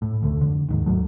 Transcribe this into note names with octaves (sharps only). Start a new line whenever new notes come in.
A2
F1 D2 D3 A3
F2 D3
D#2 G#2 D#3
G#1 D#2 F#3 A3